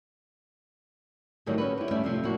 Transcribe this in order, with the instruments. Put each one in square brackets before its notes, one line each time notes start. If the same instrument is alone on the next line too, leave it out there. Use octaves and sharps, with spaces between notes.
[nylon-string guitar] A2 D3 D#3 F#3 G3 A3
C#4 F#4 B4
E4 G4
G3 A3 C#4 D5 E5
F2 C3 F3
A2 D3 A#3 C4 F#4